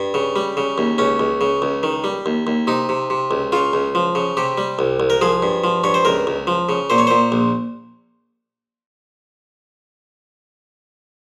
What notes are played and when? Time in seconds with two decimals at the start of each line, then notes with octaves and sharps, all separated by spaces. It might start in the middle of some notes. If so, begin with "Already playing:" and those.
Already playing: G2
0.14 C#3
0.36 G3
0.57 C#3
0.78 D#2
0.98 C#2 C#4
1.19 C#2
1.41 C#3
1.62 C#2
1.83 D#3
2.04 G3
2.26 D#2
2.47 D#2
2.67 C3 D#4
2.89 C3
3.10 C3
3.31 C#2
3.52 C#3 F4
3.73 C#2
3.95 F3
4.15 C#3
4.37 C3 G4
4.58 G3
4.79 C2
5.00 C2
5.10 A#4
5.21 F3 G#4
5.42 G2
5.64 F3
5.84 G2 C#5
5.94 C5
6.05 C#2 A#4
6.27 C#2
6.47 F3
6.69 C#3
6.90 A#2 C5
6.98 C#5
7.07 A#2 C5
7.32 A#1